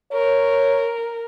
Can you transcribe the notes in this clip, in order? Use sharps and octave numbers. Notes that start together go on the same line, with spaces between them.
A#4 C#5